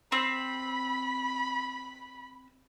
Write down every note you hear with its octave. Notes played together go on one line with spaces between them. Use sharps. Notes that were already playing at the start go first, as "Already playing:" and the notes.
C4 B5